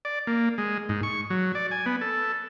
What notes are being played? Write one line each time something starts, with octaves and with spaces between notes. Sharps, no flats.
D5
A#3
G#3
G#2
C#6
F#3
D5
G#5
B3
A4